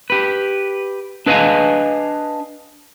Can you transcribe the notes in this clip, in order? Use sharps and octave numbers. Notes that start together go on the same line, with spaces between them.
G4 B4
D4 B4 D#5 F5 G#5